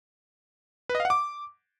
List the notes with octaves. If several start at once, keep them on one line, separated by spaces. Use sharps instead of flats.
B4
D#5
F5
F#5
D6